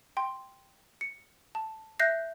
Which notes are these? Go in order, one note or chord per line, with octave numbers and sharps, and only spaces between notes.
G5 C6
C#7
A5
E5 F#6 G6 A#6 C7